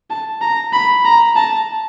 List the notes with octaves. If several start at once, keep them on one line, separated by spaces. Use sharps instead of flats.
A5
A#5
B5
A#5
A5